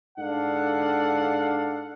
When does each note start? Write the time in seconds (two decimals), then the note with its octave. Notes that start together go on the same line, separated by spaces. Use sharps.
0.18 G#2 D4 A4 F5 F#5